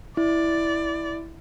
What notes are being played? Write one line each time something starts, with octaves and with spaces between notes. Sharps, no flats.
E4 D5